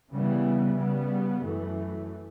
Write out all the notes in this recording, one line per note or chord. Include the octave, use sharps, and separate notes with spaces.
C#3 E3 G3 B3
C#3 G3 B3
F#2 E3 A3